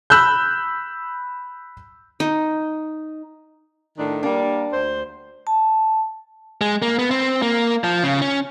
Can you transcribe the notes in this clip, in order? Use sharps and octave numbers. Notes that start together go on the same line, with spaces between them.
B5 E6 F#6 G6
D#4
A2 D#3 D4
G3 A#3 D4
D2 C5
A5
G#3
A#3
B3
C4
A#3
F3
C#3
C#4